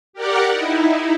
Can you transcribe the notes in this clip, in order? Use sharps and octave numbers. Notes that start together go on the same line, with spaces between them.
G4 A#4 D5 F#5
D#4 E4